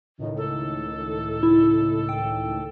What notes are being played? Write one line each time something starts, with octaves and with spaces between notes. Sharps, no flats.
C#2 A2 D#3
A4
E4
G5